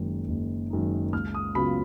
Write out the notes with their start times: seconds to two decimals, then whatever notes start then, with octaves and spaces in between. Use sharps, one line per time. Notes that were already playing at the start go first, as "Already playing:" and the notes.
Already playing: F#1 F#2 D#3 G#3 D#4
0.28 F#1
0.70 F#2 D#3 G#3 D#4
1.13 C#2 F6
1.35 D#6
1.55 C#3 F#3 B3 F4 B5